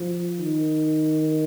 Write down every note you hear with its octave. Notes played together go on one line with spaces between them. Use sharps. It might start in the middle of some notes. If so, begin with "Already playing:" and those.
Already playing: F3
D#3